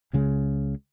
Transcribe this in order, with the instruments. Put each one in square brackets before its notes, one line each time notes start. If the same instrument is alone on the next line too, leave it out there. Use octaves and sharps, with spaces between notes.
[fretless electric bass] C#2 C#3 G#3